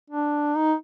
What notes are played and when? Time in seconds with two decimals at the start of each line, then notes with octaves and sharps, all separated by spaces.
0.10 D4
0.56 D#4